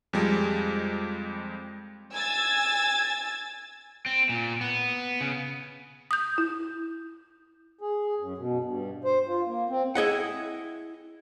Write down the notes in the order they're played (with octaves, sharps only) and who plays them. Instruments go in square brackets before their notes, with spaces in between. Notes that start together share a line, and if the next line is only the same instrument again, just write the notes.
[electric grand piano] F2 G3 G#3
[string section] G#5 E6 G#6 A6
[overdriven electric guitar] C4
A#2
B3
C#3
[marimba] D#6 G6
E4
[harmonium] G#4
F#2
B2
G2
C5
F4
A#3
C4
[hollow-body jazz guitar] E4 G#4 D#5 F#5